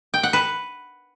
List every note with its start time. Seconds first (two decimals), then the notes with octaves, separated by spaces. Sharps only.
0.14 G5
0.23 F#5
0.33 B4